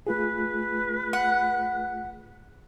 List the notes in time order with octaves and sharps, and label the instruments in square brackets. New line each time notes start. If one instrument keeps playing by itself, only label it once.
[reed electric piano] A3 F4 G#4 [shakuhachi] B4
[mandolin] F#5